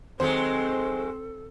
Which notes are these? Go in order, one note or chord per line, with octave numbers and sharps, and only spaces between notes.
D#3 F#3 G#3 C4 A4 C5